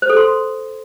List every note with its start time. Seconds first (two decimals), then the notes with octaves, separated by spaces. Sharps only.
0.02 C5
0.10 A4
0.17 C6